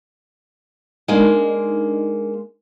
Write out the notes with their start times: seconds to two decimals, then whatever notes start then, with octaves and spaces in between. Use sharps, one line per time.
1.08 G#3 A#3 D4 D#4